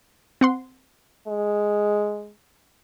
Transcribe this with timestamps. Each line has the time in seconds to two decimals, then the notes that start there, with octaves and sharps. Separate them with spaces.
0.41 C4 F#5 C6
1.28 G#3